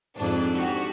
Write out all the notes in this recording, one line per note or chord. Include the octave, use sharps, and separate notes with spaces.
F2 G#2 D4
D4 F#4 G4